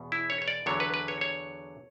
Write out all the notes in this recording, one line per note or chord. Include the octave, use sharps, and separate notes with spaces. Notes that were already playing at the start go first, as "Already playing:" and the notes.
Already playing: E2 B2
E4
C#5
C#5
D5
E2 D3 F#3 B3 C#5
B4
B4
C#5
C#5